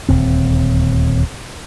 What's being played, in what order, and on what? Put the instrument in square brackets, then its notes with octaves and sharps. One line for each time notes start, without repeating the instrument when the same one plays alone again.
[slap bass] D#1 D2 C4